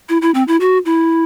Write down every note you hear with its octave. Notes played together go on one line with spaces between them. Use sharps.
E4
E4
C4
E4
F#4
E4